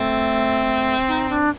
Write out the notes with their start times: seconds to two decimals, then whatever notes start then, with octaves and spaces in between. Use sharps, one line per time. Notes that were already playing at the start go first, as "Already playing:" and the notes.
Already playing: A3 C4
1.07 D#4
1.29 D4